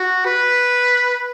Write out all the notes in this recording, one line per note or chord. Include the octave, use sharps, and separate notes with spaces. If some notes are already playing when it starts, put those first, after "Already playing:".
Already playing: F#4
B4